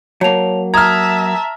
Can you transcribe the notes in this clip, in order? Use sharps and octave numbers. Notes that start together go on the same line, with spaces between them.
F#3 A#3 C#5 A5 F7
E5 A5 A#5 D#6 F6 G#6